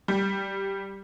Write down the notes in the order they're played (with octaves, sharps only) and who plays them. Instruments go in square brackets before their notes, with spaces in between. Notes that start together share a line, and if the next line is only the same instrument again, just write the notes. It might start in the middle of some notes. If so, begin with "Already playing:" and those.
[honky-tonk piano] G3